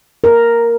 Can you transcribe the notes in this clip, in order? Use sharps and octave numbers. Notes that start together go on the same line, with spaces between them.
A#4